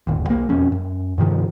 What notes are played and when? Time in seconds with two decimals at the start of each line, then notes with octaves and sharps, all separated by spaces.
0.07 D1 G1 D#2
0.27 B1 A#3
0.48 E1 F2 C#4
0.72 F#2
1.18 G2 C3 D#3 F3